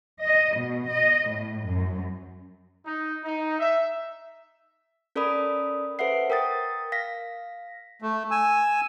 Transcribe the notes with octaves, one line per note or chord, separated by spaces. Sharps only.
D#5
B2
D#5
A2
F#2
D#4
D#4
E5
C#4 A4 A#4 D5 B5 D#6
A4 B4 C5 E5 F#5 C7
A#4 G5 D#6 A6
F5 A#6 B6
A3
G#5 E6